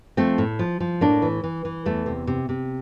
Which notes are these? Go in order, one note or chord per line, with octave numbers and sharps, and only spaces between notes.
F3 A3 C4
A2
F3
F3
A2 A#3 D4
E3
E3
E3
E2 A3
C3
C3
C3